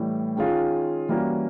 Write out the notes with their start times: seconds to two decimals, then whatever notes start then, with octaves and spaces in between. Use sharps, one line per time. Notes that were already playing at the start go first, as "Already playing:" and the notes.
Already playing: A2 E3 G3
0.37 D#3 G#3 C#4 F4 G#4
1.09 E3 G3 A#3 C#4 F#4